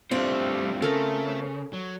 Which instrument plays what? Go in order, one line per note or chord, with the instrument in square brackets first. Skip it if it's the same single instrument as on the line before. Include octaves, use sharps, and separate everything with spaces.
[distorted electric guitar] G2 A3 [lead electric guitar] G3 C5 [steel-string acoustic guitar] C4 F4
[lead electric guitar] C#3 [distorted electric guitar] A3 [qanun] A4 A#4 C5
[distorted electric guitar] F#3